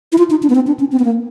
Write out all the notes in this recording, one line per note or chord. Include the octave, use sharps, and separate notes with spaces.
E4
F4
D#4
D4
B3
C4
D4
C#4
C4
B3
A#3